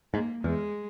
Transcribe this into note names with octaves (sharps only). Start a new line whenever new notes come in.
G#2 A#3
E2 G#3